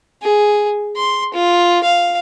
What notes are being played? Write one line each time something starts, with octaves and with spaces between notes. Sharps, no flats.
G#4
C6
F4
F5